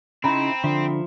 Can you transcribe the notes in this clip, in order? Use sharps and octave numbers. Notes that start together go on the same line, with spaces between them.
C#3 C4 D#4 E4 A#5 B5
D3 F3 E5 C6